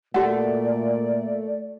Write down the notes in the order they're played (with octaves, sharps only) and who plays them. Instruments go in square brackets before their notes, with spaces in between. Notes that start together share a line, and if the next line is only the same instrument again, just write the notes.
[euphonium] A#2 [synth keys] A3 [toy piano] F#4 F#5 [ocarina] D5